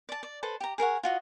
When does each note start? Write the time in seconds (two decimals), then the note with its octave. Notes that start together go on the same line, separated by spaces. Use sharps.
0.09 D5 A5
0.23 D5
0.43 A4 B4 C5
0.60 G4 A#5
0.78 G#4 A#4 C#5 F#5
1.03 F4 F#4 D#5